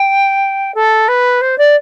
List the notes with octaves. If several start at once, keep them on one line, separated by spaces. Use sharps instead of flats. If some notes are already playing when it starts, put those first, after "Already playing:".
Already playing: G5
A4
B4
C5
D5